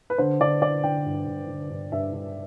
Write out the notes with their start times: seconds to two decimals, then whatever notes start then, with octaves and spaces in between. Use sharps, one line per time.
0.10 B4
0.18 D3 C5
0.40 D3 D5
0.61 D3 D5
0.83 D3 G5
1.06 G2
1.27 G2
1.48 D3
1.70 G2
1.92 G2 E5
2.13 G2